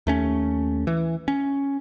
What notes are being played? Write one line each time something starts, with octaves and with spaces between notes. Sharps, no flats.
D#2 A3 C#4
E3
C#4